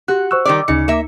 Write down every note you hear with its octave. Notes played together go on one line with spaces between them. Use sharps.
F#4 G4 F#6
C5 C#6 E6 F#6
D#3 G3 D5 D6
D2 C#3 D#4 C#7
A#3 E5